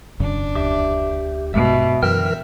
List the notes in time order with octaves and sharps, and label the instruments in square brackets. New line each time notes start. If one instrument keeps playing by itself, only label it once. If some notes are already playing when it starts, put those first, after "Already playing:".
[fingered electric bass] E1 F#2 C#3 [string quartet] D4
[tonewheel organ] D2 G4 [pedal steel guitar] E5 D6
[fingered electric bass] A#1 G#3 [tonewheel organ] G2 [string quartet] B2 [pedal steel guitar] E5
[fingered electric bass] F#2 [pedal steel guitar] D3 G5 [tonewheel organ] E3 A#4 F6 [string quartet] E5